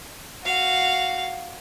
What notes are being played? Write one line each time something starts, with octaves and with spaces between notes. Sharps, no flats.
F#4 F5